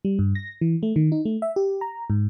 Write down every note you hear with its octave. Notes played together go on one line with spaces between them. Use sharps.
G3
G2
A#6
E3
A3
D#3
D#4
A3
E5
G4
A#5
G#2